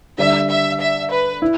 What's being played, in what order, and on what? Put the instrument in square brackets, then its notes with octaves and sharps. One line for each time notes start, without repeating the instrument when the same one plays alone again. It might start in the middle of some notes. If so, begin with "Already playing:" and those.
[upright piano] D3 G3 D4 [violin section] E5
[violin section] E5
E5
B4
[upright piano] E4